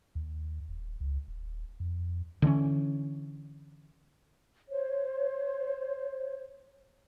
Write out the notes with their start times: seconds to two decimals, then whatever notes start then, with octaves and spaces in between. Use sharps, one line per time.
0.15 D#2
0.68 D#1
1.00 C#2
1.28 D#1
1.80 F2
2.42 D3 E3 B3 C#4
4.70 C5 C#5